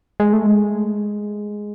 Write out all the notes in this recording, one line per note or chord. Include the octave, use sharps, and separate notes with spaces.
G#3
A3
G#3